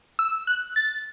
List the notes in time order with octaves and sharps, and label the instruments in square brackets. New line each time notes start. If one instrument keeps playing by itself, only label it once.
[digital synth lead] E6
F#6
A6